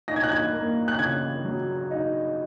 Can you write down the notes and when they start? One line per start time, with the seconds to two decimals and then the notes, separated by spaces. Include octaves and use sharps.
0.08 D#4 A#6
0.16 G#6
0.23 F#6
0.32 G#6
0.53 A#3
0.88 F#6
0.99 C#3 G#6
1.45 F#3
1.91 D#4